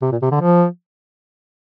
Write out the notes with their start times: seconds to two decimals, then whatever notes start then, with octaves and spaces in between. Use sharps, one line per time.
0.02 C3
0.12 A#2
0.22 C3
0.31 D3
0.41 F3